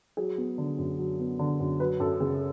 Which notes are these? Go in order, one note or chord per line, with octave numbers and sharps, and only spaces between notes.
F#3 G#4
B3
D3
F#2
F#3
B3
D3
F#2
F#3 B4
F#2 A4
C#3 G#4